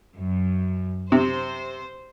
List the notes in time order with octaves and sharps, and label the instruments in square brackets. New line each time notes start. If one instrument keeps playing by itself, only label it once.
[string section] F#2
[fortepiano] C3 [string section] C5